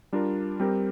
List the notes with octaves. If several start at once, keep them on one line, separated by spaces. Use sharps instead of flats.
G3 D4 F4 A#4
G3 C4 G4 A#4